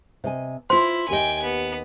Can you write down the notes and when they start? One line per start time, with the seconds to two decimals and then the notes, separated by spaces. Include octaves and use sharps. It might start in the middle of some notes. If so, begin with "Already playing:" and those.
0.24 C3 D#5 G#5
0.70 E4 F4 C5 C6
1.09 D#2 G4 D#5 G5 G#5
1.43 B3